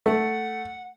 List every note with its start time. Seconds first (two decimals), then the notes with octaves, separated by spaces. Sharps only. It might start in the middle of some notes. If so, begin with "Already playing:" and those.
0.06 A3 F#5